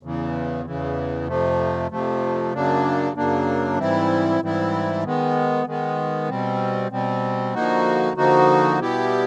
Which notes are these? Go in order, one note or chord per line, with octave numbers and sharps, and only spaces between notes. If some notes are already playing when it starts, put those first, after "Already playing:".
E2 C#3 E3
E2 C#3 E3
F2 C3 F3 A3
F2 C3 F3 A3
F#2 C#3 F#3 A#3 D4
F#2 C#3 F#3 A#3 D4
G#2 E3 G3 C4 E4
G#2 E3 G3 C4 E4
D#3 G#3 B3
D#3 G#3 B3
B2 G3 C4
B2 G3 C4
D3 F3 A#3 D#4 F#4
D3 F3 A#3 D#4 F#4
B2 G3 B3 E4 G4